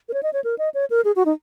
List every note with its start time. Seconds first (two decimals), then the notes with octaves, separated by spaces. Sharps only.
0.09 A#4
0.14 C#5
0.23 D#5
0.33 C#5
0.44 A#4
0.58 D#5
0.74 C#5
0.90 A#4
1.05 G#4
1.16 F#4
1.26 D#4